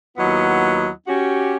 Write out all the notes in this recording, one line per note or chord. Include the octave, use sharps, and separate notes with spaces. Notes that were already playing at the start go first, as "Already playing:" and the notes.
D#2 F#3 B3 E4 F4 D#5
C#4 F#4 G4